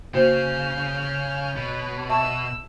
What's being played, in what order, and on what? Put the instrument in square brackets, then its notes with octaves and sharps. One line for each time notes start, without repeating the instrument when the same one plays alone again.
[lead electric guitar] C#3 [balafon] A#3 F#4 C5 [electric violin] F6 G6
[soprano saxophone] C#5
[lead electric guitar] B2 [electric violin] B4
[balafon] E5 A5 C#6 [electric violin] E6